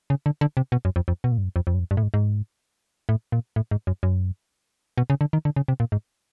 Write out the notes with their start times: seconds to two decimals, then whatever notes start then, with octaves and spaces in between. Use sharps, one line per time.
0.10 C#3
0.26 D3
0.41 D3
0.57 C3
0.72 B2
0.85 F#2
0.96 F2
1.08 F2
1.24 B2
1.32 A#2
1.38 G2
1.44 F#2
1.56 F2
1.67 F2
1.74 F#2
1.79 F2
1.91 G2
1.97 A2
2.03 G#2
2.14 G#2
3.09 A2
3.32 A#2
3.56 A2
3.71 G#2
3.87 F#2
4.03 F#2
4.98 B2
5.10 C#3
5.21 D3
5.33 D#3
5.45 D3
5.56 C#3
5.68 C3
5.80 A#2
5.92 G#2